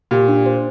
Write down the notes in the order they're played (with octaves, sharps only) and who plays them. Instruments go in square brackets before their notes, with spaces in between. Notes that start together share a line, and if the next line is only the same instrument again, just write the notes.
[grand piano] A#2 [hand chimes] G4
[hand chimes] D4
C5